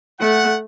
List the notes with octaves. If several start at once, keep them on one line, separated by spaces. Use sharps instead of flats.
A3 F#5